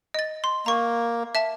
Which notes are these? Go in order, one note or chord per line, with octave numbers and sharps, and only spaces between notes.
D#5 A6
C6
A#3 A#5 C#6
E5 A5